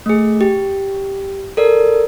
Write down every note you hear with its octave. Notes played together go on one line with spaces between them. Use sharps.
A3 G#4
G4
A4 A#4 D5